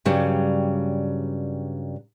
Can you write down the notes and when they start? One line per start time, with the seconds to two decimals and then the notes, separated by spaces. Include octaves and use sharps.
0.05 G2 C#3 F#3 G3